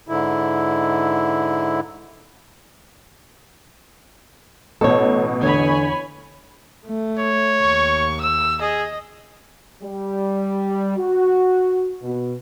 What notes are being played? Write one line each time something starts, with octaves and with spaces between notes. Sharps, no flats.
G#2 D3 E4
A1 B2 A4 C#5
E2 D3 C#5 G#5 B5
A3
C#5
D#2 C#6
E6
G#4 D#5
G3
F#4
B2